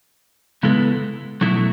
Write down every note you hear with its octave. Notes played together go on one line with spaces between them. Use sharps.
C#3 G#3 B3 E4 A4
B2 F#3 A3 E4